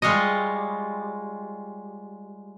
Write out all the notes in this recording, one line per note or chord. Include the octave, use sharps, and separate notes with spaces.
G3 G#3 F4 C#5 D#5